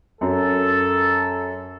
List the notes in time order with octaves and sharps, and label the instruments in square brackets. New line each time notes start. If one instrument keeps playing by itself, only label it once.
[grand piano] F#2 [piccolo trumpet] A4